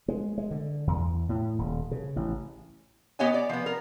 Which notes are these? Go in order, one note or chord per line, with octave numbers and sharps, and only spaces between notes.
G#3
G#3
D3
E2
A2
D#1
C#3
A1
B3 G4 C#5 D#5 F#5 G#5
D5
F3 B3
A#4